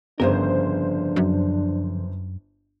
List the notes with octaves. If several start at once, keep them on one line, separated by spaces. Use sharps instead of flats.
G1 F2 C#3 D4 A#4 C5
F#2